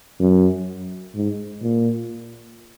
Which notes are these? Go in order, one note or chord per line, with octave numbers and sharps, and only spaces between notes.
F#2
G#2
A#2